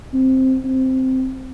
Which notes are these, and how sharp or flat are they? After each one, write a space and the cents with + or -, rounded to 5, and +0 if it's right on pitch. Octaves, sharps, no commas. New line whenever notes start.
C4 +0
C4 -5